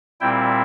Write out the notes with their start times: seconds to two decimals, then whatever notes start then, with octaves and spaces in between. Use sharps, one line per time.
0.21 A#2 G3 C4 E4 G5